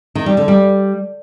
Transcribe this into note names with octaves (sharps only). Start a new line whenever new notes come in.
D#3
G3
D3
G3